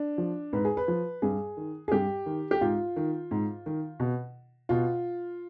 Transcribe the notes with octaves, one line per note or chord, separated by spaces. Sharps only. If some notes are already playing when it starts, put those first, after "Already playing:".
Already playing: D4
F3
G#2 B4
G#4
B4
F3
G2 G#4
D#3
G#4
G2 G4
D#3
G4
G#2 F4
D#3
G#2
D#3
B2
B2 F4